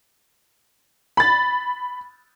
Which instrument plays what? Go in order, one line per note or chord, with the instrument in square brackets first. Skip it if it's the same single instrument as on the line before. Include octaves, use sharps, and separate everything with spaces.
[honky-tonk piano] B5 A6